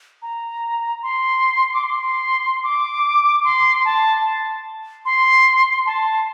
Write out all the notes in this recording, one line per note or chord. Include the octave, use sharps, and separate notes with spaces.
A#5
C6
D6
C6
D6
C6
A5
C6
A5